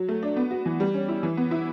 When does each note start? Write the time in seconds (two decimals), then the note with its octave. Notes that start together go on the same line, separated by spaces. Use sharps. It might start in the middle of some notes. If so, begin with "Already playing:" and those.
Already playing: F#3
0.09 A3
0.23 D4
0.37 B3
0.51 F#4
0.66 E3
0.80 G3
0.94 C#4
1.08 E4
1.23 E3
1.37 B3
1.51 E4